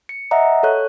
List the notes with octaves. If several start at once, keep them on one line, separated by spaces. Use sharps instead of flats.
C#7
D#5 E5 F#5 A#5
A4 C#5 F#6